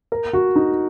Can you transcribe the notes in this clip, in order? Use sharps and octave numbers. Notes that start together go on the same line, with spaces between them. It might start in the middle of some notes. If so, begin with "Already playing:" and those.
A#4
F#4
D#4